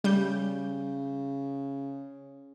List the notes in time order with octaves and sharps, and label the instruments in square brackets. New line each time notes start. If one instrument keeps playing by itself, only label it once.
[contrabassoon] C#3 [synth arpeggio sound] G3 G6